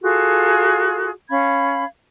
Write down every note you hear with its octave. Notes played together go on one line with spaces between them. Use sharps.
F4 F#4 G#4 A4
C#4 F5 B5 G#6